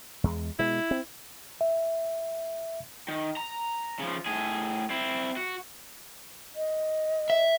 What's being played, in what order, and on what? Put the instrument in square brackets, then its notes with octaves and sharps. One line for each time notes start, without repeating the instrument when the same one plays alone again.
[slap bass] E2 G#3
[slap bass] B2 G#3 [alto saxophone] E4
[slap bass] C4
[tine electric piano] E5
[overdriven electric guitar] D#3
A#5
C#3 F3
A2 G#4
C4 E4
F#4
[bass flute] D#5
[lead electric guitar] E5